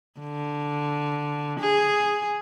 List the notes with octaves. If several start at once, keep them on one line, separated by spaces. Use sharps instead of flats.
D3
G#4